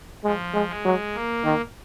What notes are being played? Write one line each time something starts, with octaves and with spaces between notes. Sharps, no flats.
F3 G#3
G#3
G#3
F#3
A#3
D#3